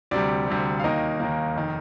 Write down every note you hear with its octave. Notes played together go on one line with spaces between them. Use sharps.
D2 C3 G3 D5
D2 C3 G3
F5
D#2 D#3 A#3 D#5
D#2 D#3 A#3
F1 D#3